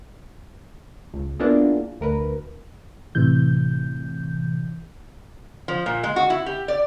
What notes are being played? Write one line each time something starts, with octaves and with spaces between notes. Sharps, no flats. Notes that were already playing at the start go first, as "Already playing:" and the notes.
C#2
A#3 B3 D4 E4 F4 G#4
D2 A#4 B4
A2 C3 E3 G6
F3
A#2
G#3
F#4
E4
G4
D5